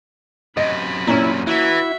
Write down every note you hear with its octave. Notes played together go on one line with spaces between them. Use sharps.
F#2 C3 D#5 B5
A#2 C#4 E4
E3 E4 F#4 E5